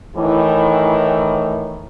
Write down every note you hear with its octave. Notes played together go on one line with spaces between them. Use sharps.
A2 D#3 E3